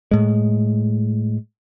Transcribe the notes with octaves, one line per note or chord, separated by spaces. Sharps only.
A2 G#3